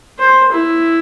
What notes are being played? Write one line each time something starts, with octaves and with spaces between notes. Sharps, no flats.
C5
E4